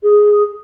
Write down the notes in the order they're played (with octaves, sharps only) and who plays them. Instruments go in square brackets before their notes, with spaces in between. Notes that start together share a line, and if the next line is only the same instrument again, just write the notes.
[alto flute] G#4